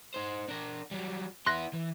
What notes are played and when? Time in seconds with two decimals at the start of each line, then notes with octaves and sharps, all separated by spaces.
0.14 D#4 C5
0.48 D4 A#4
0.91 F#3 G3
1.46 B3 E4 C6 F#6 A#6
1.73 E3